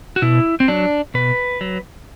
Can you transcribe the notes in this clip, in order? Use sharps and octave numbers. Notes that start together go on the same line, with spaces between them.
F#4
B2 E4
C4
F#3 D4
B2 B4
F#3